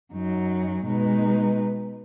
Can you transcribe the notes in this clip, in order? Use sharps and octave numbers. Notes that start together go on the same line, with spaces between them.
F#2 F#3 D#4
B2 G#3 D#4 B4